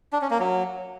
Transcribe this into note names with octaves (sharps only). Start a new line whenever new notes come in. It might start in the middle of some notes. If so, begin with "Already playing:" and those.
D4
C#4
A#3
F#3